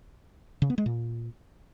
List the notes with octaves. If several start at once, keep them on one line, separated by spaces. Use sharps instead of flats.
C#3
B3
G#3
A#2